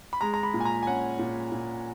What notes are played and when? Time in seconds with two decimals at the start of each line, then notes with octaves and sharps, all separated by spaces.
0.13 B5
0.21 G#3 A#5
0.34 A#5
0.43 B5
0.54 A#2
0.61 G#5
0.65 A#5
0.83 G#5
0.87 C#4 F#5
1.19 A#2
1.52 A#2